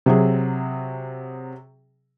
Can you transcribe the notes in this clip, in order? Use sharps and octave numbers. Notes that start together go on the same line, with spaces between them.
C3 F#3 G#4